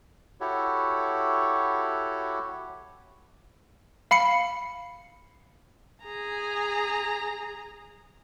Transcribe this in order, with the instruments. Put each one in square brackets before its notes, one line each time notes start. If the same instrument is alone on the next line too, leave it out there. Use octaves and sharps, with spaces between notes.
[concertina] E4 F#4 G4 A4 C#5
[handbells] F5 B5 C7 C#7
[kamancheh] G#4 A#5